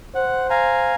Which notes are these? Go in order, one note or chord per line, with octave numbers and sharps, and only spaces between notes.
C5 F#5
F5 G#5 A#5